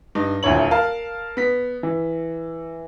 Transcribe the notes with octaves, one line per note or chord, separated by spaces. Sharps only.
G2 D#4
D#1 D2 E4 C#5 F#7
A#4 F5 A5
B3 B6
E3